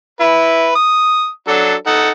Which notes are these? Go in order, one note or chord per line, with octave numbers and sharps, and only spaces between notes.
E4 B4
D#6
F#3 D4 A4
D#4 A4 F#5